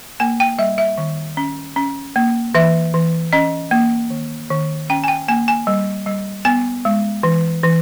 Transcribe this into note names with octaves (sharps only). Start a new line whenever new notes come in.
A#3 G#5
G5
G3 E5
E5
D#3
C#4
C#4
A#3
E3 E5
E3
C#4 D#5
A#3
D#3
D#3
C#4 G5
G#5
G5
A#3 G#5
G#5
G3
G3
B3 G#5
G#3
E3
E3